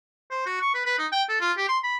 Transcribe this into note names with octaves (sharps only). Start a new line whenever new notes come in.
C5
F#4
C#6
B4
B4
D#4
G5
A4
F4
G4
C6
B5